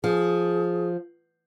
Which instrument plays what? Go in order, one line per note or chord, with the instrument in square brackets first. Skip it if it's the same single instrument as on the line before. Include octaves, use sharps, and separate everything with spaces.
[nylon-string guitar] F3 [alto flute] G#4